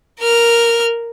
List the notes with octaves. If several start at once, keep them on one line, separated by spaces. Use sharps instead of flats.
A#4 F6